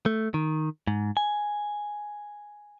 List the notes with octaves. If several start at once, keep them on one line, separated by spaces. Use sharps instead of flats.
A3
D#3
G#2
G#5